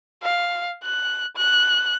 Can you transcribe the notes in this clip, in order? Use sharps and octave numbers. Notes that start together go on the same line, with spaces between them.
F5
F#6
F#6